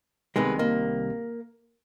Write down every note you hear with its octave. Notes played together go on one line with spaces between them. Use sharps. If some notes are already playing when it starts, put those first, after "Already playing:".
C2 C3 D#3 G#3 B3
A#3